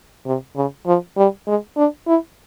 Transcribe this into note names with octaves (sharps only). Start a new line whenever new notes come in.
C3
C#3
F3
G3
G#3
D4
E4